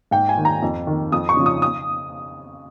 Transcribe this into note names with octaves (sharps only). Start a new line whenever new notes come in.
G#2 G5
G#5
D#3
A#5
F2
D#3
F2 D#6
C#6
C#3 F3
D#6
D#6